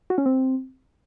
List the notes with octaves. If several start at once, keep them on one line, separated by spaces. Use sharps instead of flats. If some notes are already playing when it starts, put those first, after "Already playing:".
F#4
C#4
C4